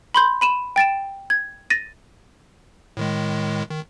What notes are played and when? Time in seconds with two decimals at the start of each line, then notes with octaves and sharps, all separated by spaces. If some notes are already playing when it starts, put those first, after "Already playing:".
0.14 B5 C6 G6
0.41 B5 D#7 E7
0.76 G5 A6 D7 E7
1.30 G#6
1.70 A6 A#6 D#7
2.97 A2 D#3 G#3
3.70 D#3